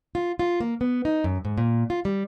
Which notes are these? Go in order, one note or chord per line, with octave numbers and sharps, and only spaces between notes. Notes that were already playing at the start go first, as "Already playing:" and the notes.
F4
F4
A#3
B3
D#4
F#2
G#2
A#2
F4
G3